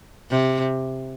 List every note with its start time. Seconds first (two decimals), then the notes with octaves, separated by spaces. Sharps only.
0.30 C3